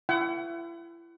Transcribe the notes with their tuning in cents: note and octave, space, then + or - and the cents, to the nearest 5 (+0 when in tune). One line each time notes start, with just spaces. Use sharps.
E4 +35 F#5 +35